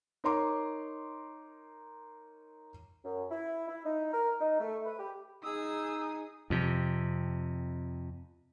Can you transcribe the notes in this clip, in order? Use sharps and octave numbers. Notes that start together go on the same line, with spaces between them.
D#4 A#4 C#5 A#5 C6 D6
F#2
E4
E4
D#4
A#4
D#4
A3
B4
G4
D#4 G#4 D#6 E6
F2 C3